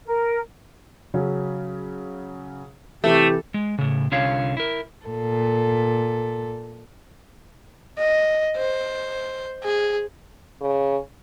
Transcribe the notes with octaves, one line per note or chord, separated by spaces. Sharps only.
A#4
C#3 F#3 C#4
C3 E3 A3 C4 G4
G#3
A2 C#3
C2 D3 C#4 F4 C#5 F5
E4 A#4
A#2 A4
D#5
C5
G#4
C#3